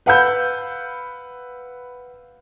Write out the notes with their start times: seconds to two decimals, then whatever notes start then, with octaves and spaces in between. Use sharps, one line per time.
0.06 B4 F5 F#5 B5 E6 G6